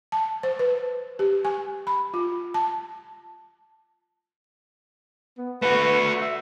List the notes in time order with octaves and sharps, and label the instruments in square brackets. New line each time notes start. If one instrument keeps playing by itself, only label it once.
[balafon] A5
C5
B4
G4
G#5
B5
F4
A5
[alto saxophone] B3
[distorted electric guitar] A3 F#4 [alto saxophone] B4
[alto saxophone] E5